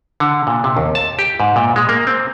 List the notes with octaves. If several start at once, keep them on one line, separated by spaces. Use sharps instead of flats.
D3
A#2
C3
D#2
A5
G4
G#2
A#2
G#3
A#3
C4